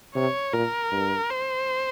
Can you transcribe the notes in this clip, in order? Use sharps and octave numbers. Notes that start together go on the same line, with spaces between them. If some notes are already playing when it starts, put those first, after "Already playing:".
C3 C#5
A#2 A#4
G2
C5